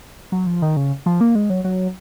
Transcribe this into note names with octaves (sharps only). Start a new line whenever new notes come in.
F#3
F3
D#3
C#3
F3
A#3
G#3
F#3
F#3